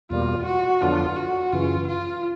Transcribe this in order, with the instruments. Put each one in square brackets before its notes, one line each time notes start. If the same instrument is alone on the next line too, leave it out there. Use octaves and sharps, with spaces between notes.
[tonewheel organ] E2 B2 G3 A#3 [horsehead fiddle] F4
[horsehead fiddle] F#4
[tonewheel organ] F2 D3 F#3 B3 D4 [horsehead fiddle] F4
[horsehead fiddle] F#4
[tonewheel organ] F#2 C#3 E3 [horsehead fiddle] F4
[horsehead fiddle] F4